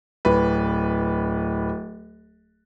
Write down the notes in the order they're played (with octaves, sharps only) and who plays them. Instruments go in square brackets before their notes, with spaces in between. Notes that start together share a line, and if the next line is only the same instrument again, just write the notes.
[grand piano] D1 B4